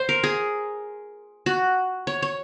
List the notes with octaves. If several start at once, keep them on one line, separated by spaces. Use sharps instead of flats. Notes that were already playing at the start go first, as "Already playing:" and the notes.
Already playing: C5
A#4
G#4
F#4
C#5
C#5